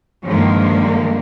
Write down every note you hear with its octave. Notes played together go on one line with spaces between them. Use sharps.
G2 D3 D#3 F3 G#3 A#3